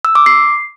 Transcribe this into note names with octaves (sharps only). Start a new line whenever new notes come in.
E6
D6
C7